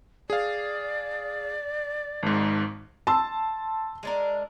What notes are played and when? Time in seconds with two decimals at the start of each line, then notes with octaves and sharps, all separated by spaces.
0.30 G#4 D5 F5
2.23 G#1 G#2
3.07 A5 C6 E6
4.03 G#3 D4 A#4